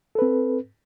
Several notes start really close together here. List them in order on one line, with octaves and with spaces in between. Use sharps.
A4 B4 C4